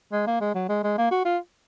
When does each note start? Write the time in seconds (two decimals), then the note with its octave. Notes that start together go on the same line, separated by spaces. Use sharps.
0.12 G#3
0.27 A#3
0.41 G#3
0.55 F#3
0.69 G#3
0.84 G#3
0.98 A#3
1.11 F#4
1.25 F4